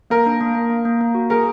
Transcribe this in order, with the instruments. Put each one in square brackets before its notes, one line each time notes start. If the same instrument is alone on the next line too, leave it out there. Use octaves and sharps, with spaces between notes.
[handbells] A#3 [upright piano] A#4
[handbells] D4
A#3
A#3
A#3
A#3
A#3
F#4
[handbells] G#4 [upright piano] A#4